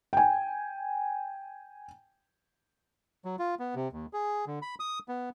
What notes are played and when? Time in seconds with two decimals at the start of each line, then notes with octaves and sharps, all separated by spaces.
0.13 G5 G#5
3.25 F#3
3.39 F4
3.59 B3
3.75 C3
3.93 D#2
4.13 G#4
4.47 D3
4.62 B5
4.80 D#6
5.08 B3